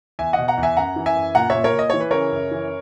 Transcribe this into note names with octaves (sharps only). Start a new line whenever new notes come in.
E2 E5 G#5
D#5 F#5
B2
F#5 A#5
E2
E5 G#5
F#2 F#5 A#5
E3
E5 G#5
F#2
A#2 F#5 A#5
A#2 C#5 E5
A#4 C#5
A#2
D#5
E3 C#5
B4
C#3 A#4 C#5
F#2
E3